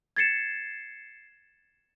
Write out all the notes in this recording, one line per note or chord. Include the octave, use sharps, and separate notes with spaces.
G#6 A6 C7 C#7 E7